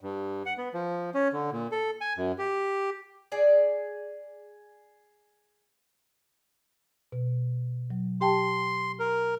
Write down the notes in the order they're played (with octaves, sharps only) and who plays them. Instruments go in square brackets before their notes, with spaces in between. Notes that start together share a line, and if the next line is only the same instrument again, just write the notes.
[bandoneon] G2
F#5
B3
F3
C#4
D3
A#2
A4
G#5
F#2
G4
[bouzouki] G#4 D5
[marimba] B2
F#3
[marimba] G4 G5 A5 [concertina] C6
[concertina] A#4